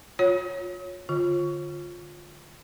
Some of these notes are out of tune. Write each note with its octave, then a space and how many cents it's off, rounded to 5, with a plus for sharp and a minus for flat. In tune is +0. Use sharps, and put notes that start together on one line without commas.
F4 +30 C#5 +0
D3 +0 F4 +10